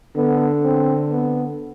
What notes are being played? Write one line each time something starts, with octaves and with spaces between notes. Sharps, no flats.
D3 B3
C4
B3